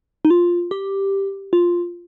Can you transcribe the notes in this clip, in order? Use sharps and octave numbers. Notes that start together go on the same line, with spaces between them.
D#4
F4
G4
F4